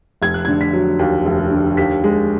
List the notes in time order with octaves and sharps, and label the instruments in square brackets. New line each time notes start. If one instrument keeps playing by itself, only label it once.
[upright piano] F1 G#6
F#6
D3 G#6
B6
F#3
D#2
F1
D3
D#2 B6
G#3